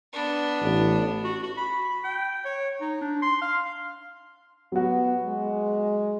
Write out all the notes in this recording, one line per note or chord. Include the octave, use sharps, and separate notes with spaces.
B3 D4
A1
F#4
F#4
B5
G5
C#5
D#4
D4
C6
F5
F#3 B3 F#4
G#3